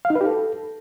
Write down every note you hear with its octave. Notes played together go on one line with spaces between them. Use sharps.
F5
D#4
B4
G4
A4